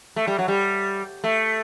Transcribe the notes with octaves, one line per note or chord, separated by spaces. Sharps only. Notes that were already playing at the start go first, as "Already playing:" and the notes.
A3
G3
F#3
G3
A3